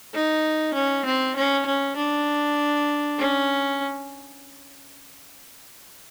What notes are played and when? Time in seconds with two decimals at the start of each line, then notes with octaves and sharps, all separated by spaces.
0.14 D#4
0.74 C#4
1.05 C4
1.36 C#4
1.66 C#4
1.96 D4
3.19 C#4